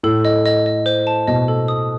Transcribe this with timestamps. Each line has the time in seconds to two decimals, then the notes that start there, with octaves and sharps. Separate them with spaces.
0.03 A2 A4
0.25 D#5
0.45 D#5
0.66 D#5
0.86 C5
1.07 A5
1.28 B2 D#5
1.48 A4
1.68 D#6